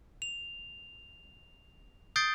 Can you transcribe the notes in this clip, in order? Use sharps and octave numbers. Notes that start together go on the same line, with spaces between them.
F7
D#6 G6 A6 C7 D7 G7